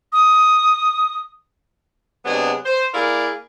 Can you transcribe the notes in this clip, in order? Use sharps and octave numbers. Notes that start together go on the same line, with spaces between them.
D#6
C3 F#3 G#3 B3 D4 G#4
C5
A#3 E4 G#4 A#4 D5 F5